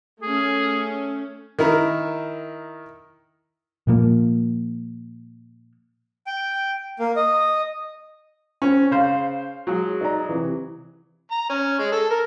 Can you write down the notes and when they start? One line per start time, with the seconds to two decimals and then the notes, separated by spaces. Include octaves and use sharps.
0.22 A3 C#4 G#4
1.59 D#3 E4 A#4
3.87 A#2 F3 A#3
6.26 G5
6.99 A#3
7.16 D#5
8.62 C4 C#4
8.91 C#3 C5 F5
9.67 F#3 G#3
10.01 D#4 D5 A#5
10.29 C3 E3
11.31 A#5
11.49 C#4
11.79 G#3
11.92 A4
12.10 A#4